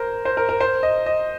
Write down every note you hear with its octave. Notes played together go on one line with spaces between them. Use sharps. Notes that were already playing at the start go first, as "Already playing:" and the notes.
Already playing: A#4 C5
C5
A#4
A#4
C5
D#5
D#5